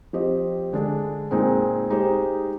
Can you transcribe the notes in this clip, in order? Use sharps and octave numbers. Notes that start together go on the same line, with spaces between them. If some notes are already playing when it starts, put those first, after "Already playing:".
F3 C4 G4 C5 D#5
D3 G#3 D4
A#2 G#3 C4 D#4
G#3 D#4 G4 C5